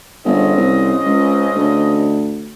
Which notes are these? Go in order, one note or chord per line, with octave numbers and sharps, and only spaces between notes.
G1 C#3 C4 D#5
C2
C#2
D2